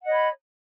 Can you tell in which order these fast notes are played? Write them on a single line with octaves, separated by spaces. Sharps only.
F#5 D#5 C#5 B5